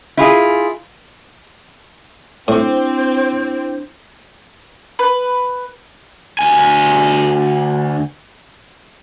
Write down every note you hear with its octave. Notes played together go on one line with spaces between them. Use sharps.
E4 F4 G#4
A2 C4 D4 E4 C5
B4
D2 G#5